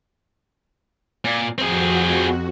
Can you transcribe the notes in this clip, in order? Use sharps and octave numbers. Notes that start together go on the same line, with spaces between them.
A#2
F2 C4 F#4 G#4